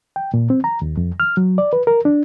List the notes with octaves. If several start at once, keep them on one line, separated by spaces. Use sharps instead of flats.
G5
A#2
C4
A#5
D#2
F2
F6
F#3
D5
B4
A#4
D4